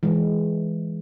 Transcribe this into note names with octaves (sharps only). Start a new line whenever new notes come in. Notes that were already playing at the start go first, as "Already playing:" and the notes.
E3 G#3